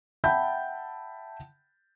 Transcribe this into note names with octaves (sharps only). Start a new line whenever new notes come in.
E5 F#5 G5 A5 B5 G6